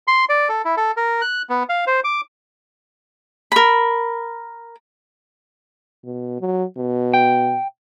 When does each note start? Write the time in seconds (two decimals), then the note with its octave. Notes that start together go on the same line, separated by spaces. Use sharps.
0.08 C6
0.29 D5
0.49 A4
0.65 E4
0.77 A4
0.97 A#4
1.21 F#6
1.50 B3
1.69 F5
1.87 C5
2.04 D6
3.52 A#4 B5
6.04 B2
6.40 F#3
6.77 B2
7.14 G5